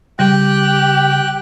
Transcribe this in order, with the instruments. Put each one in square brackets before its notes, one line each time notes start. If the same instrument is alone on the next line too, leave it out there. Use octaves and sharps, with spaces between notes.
[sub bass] C#3 [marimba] G3 [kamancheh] G4 [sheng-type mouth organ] G5 F#6